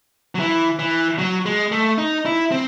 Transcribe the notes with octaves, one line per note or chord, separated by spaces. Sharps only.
F#3
E3
E3
F#3
G#3
A3
D#4
E4
C4